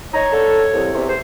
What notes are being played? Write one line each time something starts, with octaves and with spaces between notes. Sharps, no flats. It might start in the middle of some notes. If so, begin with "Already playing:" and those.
D#4 C#5 A#5
D3 A4
C2
E2 C3
C5